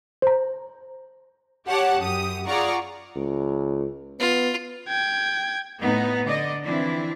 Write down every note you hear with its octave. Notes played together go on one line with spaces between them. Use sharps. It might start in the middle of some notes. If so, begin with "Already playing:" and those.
C5 A#5
G4 C#5 F#5 A5 D6
F#2 G4 D#6
F4 G#4 D5 F#5 A#5 C#6
C#2
B3 F4
G5 G#6
A2 B3 D#4
D3 D5 D#5
E3 F3 C4 D4 E4